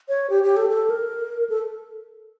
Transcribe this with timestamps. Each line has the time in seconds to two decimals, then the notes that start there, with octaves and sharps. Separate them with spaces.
0.09 C#5
0.30 G4
0.43 G4
0.57 A4
0.70 A4
0.90 A#4
1.50 A4